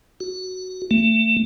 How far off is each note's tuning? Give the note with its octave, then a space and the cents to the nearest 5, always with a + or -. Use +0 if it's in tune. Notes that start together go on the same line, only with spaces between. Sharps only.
F#4 +5
A3 +30